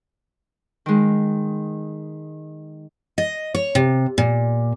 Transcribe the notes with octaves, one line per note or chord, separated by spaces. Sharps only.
D#3 G#3
D#5
C#5
C3
A#2